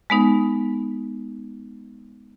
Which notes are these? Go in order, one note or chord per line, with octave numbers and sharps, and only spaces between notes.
G#3 B3 D#4